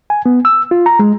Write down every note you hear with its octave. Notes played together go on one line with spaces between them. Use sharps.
G#5
B3
E6
F4
A#5
G#3